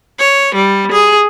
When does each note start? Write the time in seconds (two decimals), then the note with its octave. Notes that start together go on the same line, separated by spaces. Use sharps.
0.19 C#5
0.55 G3
0.92 G#4